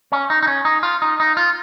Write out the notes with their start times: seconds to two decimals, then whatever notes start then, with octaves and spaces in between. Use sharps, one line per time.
0.12 C#4
0.30 D#4
0.42 D#4
0.48 C#4
0.65 D#4
0.83 F4
1.02 D#4
1.20 D#4
1.37 F4